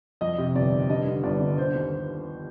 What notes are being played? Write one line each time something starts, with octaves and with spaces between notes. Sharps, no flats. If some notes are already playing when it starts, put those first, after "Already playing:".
F2 D#5
C3
G1 D5
D#3
G2 D#5
D3
G1 D5
G1
D3 C5
D#2